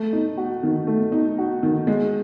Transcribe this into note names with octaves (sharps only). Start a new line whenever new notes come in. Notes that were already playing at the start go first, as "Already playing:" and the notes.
Already playing: A3
D#4
F#4
D#3
A3
D#4
F#4
D#3
G#3